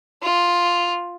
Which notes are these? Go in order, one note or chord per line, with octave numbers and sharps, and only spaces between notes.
F4